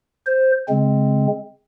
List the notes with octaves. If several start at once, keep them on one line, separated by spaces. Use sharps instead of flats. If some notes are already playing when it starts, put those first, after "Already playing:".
C5
C#3 G#3 C4